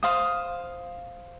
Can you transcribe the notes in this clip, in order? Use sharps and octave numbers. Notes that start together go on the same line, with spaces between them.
C5 F5 D#6